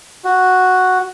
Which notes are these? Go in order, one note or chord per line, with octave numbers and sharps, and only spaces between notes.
F#4